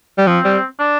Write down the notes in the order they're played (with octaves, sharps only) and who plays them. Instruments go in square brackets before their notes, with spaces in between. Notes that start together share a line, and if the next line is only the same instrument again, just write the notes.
[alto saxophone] G3
[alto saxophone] F3 [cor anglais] C4
[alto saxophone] G3
[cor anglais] D4